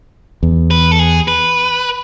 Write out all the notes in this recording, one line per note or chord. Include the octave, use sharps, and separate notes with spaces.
E2
B4
A4
G#4
B4